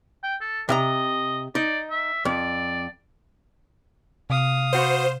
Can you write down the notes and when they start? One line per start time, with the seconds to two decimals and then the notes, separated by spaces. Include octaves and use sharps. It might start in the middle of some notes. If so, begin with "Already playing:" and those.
0.23 G5
0.41 A4
0.69 C3 D#5 E5 A#5
1.55 D#4 D5
1.90 E5
2.25 F2 D5
4.30 C3 F5 D#6
4.73 B3 F#4 C5